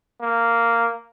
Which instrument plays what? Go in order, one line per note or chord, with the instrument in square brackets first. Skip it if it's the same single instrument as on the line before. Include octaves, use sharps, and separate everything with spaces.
[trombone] A#3